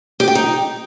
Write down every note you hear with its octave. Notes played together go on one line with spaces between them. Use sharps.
G4
G5
D#4